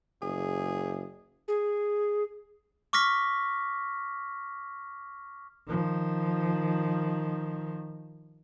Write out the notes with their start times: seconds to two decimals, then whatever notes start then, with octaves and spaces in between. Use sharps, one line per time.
0.22 F#1 G#4
1.48 G#4
2.93 C#6 D6 F6 A#6 B6
5.67 D#3 F3